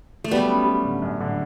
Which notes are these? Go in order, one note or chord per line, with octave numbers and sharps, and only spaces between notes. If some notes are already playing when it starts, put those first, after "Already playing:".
A3
F#3 G3 B3
C#4
F#3
D3
F#2
D3